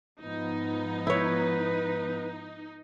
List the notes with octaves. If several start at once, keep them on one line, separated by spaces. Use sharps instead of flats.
G#2 F3 B3 D#4
E4 B4 C#5